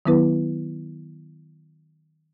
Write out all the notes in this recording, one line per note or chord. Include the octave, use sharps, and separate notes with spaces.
D#3 F#3 B3 E4 B4